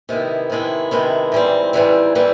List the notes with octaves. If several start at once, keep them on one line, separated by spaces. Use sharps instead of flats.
C3 D#3 G#3 B3 E4
C3 D#3 G#3 B3 E4
C3 D#3 G#3 B3 E4
G#2 E3 G3 C4
G#2 E3 G3 C4
E3 G3 C4